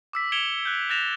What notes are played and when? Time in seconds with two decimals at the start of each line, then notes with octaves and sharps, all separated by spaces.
0.13 D6 E6 B6
0.32 G#6 C#7 D7 E7 F7 G7
0.65 F#6 G6
0.89 F#6 G6 A6 A#6 E7 F7